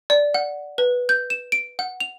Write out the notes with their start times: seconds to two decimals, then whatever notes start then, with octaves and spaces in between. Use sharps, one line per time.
0.10 D5
0.34 F#5
0.78 B4
1.09 G6
1.30 E7
1.52 D7
1.79 F#5
2.00 F7